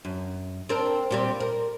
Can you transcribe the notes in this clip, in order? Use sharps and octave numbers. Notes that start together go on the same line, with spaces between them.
F#2
C4 D4 A#4
A#2 G3 C4
A#4